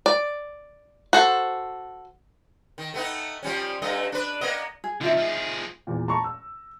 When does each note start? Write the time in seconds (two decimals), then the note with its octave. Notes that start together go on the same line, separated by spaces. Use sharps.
0.06 D5
1.13 F#4 A4 C5
2.78 D#3
2.94 A3 B3 D#4
3.43 F3 G3 C#4
3.82 G2 A3 D#5
4.12 D4 B4
4.41 A#3 B3 D#5
4.84 G#4
5.01 D3 C4 D#4 F4 E5
5.17 F3 G#4
5.87 E2 A#2
6.08 A5 A#5 C6 C#6
6.24 E6